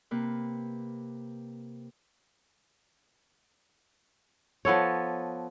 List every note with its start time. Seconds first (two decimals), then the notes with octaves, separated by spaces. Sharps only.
0.11 C3 A#3 B4
4.65 F3 B3 A4 C#5